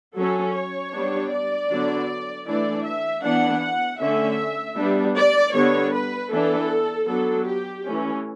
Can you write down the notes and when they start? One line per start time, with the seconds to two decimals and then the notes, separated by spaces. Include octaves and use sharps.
0.17 F#3 C#4 A4
0.54 C#5
0.94 G3 B3 D4
1.32 D5
1.70 D3 F#3 B3 D4
2.47 E3 A3 D4 D5
2.85 E5
3.23 E3 B3 D4 F#5
3.62 F#5
4.00 D3 A3 C#4 E5
4.77 G3 B3 D4
5.16 D5
5.54 D3 G3 B3 D4 C#5
5.93 B4
6.31 E3 B3 D4 A4
7.08 F#3 B3 D4 A4
7.47 G4
7.85 E3 A3 C#4